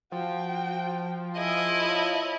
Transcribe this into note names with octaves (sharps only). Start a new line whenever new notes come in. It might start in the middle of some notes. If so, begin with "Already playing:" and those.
F3 F#4 G5
E4 G#4 D#5
C#5 A5